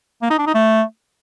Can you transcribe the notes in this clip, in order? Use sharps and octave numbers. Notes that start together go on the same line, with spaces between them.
A#3
D#4
D4
D#4
A3